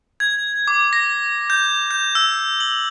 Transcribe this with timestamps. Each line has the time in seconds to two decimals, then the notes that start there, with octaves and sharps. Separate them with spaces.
0.20 G#6
0.68 D6
0.93 A#6
1.50 G6
1.91 G6
2.15 E6
2.60 F#7